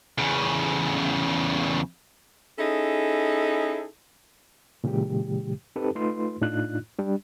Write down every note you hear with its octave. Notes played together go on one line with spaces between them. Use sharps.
E2 C#3
C#4 D#4 E4 G#4 A4
A#2 C#3 E3 G#3 G4
C4 D#4 G4 A4 B4
A3 D#4 F4 B4 C6
A2 D4 D#4 F4 F#6
G3 D4